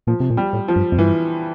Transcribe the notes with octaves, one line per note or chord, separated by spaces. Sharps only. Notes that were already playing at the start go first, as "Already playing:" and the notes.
A#2 F3
C3
A#2
G3
A2
F3
G2
F2
G2 E3